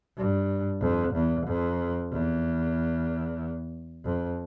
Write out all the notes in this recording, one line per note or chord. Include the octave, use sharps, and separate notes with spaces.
G2
F2
E2
F2
E2
F2